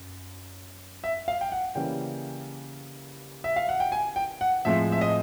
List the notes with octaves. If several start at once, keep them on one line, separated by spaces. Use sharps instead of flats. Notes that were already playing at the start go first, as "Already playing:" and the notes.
Already playing: F#2
E5
F5
G5
F#5
C#3 E3 G3 A#3 C#4 G5
E5
F5
F#5
G5
G#5
G5
F#5
A2 F3 G#3 C4 E5
E5
D#5